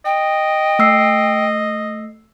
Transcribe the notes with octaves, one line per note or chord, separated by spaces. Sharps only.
D#5 G5
A3 E6 C7